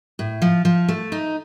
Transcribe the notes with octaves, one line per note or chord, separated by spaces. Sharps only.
A2
F3
F3
A3
D#4